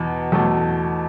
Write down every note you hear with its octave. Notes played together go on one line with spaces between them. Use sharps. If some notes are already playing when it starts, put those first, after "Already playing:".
Already playing: E2 B2
E2 B2 A3